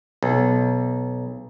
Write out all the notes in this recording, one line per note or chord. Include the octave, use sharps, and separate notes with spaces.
B1